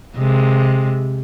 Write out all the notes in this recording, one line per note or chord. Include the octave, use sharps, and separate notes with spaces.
C3 G#3